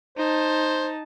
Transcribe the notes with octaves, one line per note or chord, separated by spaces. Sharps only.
D#4 C5 A5